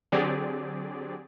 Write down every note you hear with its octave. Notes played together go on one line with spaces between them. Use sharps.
D3 F#3 C4 G4 G#4 D5